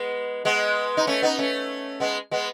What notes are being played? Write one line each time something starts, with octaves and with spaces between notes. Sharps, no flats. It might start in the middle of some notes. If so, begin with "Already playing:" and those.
Already playing: G#3 B3
G#3 B3
D#4
A3 C#4
B3 D#4
A3 C#4
G#3 B3
G#3 B3